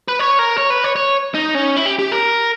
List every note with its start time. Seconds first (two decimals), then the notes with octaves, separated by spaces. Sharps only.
0.08 B4
0.19 C#5
0.39 A#4
0.58 C#5
0.70 B4
0.84 C#5
0.96 C#5
1.35 D#4
1.54 C#4
1.77 E4
1.86 G4
1.99 G4
2.12 A#4